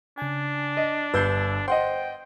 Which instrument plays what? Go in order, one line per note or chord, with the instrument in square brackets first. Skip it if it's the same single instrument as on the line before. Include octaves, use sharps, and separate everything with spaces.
[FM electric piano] C#3 G#5 [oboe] D4
[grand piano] D#5
[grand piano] G1 G6 C7 [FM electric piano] B4 E6 G#6
[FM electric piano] C5 [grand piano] D#5 F#5 C6 [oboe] G5